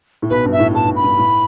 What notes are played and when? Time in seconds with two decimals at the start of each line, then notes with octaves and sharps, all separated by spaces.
0.22 A2
0.30 B1 B2 B4
0.45 G2
0.52 E5
0.60 A2
0.74 A2 A5
0.88 A2
0.96 B5
1.03 G2
1.18 A2